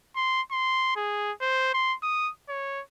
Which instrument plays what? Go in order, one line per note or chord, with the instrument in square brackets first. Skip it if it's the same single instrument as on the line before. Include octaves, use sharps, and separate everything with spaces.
[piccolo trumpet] C6
C6
G#4
C5
C6
D#6
C#5